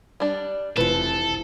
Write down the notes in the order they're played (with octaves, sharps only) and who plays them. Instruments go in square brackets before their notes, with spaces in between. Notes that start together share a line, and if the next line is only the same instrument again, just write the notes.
[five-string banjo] G3 D4
[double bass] F1 [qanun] E3 F3 [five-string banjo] A3 B4 [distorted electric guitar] A4